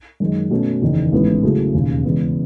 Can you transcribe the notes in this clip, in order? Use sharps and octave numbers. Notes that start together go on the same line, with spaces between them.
F#2 D#3 G#3
B2 F#3 A3 C#4
F#1 E2 D#3
A1 G#2 E3 G#3 B3
C#3 F#3 A3 E4 G#4
E1 D#2 C#3
E2 C#3 G#3 B3